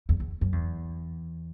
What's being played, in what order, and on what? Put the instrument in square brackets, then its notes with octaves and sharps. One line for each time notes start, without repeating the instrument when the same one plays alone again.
[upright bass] E2
E2
F#2
E2